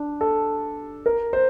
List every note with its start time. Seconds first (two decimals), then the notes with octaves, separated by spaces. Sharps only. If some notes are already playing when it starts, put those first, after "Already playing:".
Already playing: D4
0.21 A4
1.06 A#4
1.33 C5